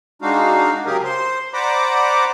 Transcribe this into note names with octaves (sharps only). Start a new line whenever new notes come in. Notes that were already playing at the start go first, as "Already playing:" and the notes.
G#3 D4 D#4 F#4 F5
C#3 F#3 G4 G#4 A#4
C5 C6
C5 D5 F#5 A#5 B5 D6